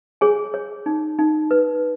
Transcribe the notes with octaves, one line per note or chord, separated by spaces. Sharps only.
G#4 C#5 G#5
C#5
D#4
D#4
B4